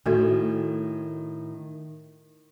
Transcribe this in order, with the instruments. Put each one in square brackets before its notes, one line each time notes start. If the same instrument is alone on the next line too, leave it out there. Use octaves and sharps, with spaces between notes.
[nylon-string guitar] A2 D#3 [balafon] A3 F#4 A4